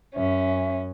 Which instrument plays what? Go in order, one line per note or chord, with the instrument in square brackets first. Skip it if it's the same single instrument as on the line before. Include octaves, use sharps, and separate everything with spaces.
[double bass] F#2 [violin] C#4 [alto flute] E5